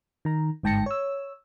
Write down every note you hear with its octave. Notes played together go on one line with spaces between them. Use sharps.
D#3 A#5
G1 G#2 G5 A5 A#6 C#7
C#5 E6